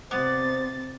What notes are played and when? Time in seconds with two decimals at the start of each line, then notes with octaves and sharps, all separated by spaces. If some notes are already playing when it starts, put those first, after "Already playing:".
0.11 C3 B3 C5 D5 A6